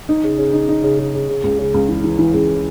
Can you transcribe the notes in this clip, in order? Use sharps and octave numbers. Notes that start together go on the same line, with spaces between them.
D#4
C#3
C#3
D#4
D#4
C#3
C#3
C#3
C#3
C#2
C#3
C#2
E3
E3
E3
C#2